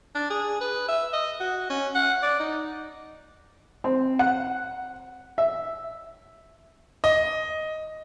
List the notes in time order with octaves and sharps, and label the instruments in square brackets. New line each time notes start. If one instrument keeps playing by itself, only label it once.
[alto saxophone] D4
G#4
B4
E5
D#5
F#4
C#4
F#5
D5
D#4
[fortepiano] C4
F#5
E5
[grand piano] D#5